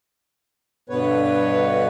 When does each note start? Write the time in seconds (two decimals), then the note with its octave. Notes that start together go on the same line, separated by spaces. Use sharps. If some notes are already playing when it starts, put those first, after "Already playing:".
0.89 G2 B2 D3 B3 B4 C#5